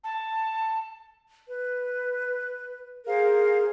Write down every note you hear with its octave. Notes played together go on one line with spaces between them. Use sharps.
A5
B4
G#4 A#4 C5 F5